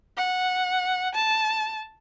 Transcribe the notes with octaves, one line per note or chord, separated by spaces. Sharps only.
F#5
A5